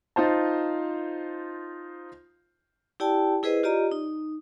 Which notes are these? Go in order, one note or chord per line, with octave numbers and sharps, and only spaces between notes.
D#4 F4 C5 A5
E4 G4 D5 G5 A5
E4 G#4 B4 C5 D#5
F4 G4 D5 D#5 A#5
D#4